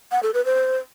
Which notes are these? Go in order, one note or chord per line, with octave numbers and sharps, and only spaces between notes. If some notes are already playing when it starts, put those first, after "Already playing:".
F#5
A4
B4
C5